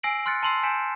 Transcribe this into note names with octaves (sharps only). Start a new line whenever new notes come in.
G#5 E6 A#6 C7 D7 F#7
C6 F6 F#6 A6 C#7
A5 B5 C6 E6 C7
G#5 G6 B6 C#7 E7